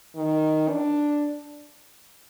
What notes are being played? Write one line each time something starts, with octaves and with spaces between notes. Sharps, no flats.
D#3
D4